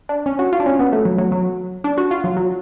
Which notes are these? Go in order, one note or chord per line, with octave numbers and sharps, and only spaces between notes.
D4
C#4
F#4
F4
D4
C#4
B3
A3
F#3
F#3
F#3
D4
F#4
F4
F#3
F#3